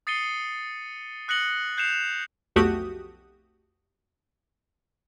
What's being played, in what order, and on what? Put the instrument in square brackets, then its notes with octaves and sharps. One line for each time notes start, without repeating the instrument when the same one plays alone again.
[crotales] D#6 A6 C7 C#7 D#7 G7
D#6 F#6 A#6 C#7 F#7 G7
F#6 G6 C7 C#7 E7 F7
[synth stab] B1 F2 A3 F#4 G4 D#6